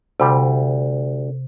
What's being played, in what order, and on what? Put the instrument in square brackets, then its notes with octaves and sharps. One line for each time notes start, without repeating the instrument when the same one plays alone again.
[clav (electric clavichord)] D2 G3 [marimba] C3